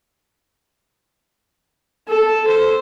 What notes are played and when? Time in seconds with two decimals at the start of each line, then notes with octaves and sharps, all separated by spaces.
2.08 A4
2.48 C5